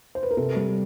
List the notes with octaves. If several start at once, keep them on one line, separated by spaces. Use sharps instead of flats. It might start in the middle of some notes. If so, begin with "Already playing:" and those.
C5
B4
A#4
C3 A4
G3